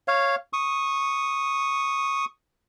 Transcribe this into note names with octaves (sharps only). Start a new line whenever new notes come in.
C#5 F5
C#6 D#6